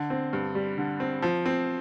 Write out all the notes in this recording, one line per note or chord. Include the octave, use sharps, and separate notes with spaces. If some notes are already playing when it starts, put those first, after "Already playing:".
Already playing: D3
C4
G2
G3
D3
C4
F3
C4